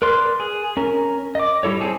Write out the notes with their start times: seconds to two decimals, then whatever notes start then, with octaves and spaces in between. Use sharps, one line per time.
0.02 A#4 B4 D5 C6
0.40 G#4
0.77 C#4 A#4
1.35 D#5 D6
1.63 G3 E4 A4 C#5
1.80 C4 G#4 A4